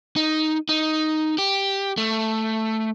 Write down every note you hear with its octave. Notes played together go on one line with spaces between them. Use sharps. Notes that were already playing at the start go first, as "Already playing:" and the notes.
D#4
D#4
G4
A3